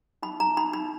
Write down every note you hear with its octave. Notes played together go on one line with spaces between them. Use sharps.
D#4 B5
D#4 A#5
D#4 B5
D#4 B5